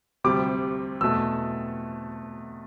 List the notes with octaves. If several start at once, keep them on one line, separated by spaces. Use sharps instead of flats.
D2 C3 G3 D6
E2 B2 A3 E6